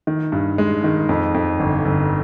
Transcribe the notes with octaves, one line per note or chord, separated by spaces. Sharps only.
D#3
G2
G#3
D#3
F2
F2
G1
G1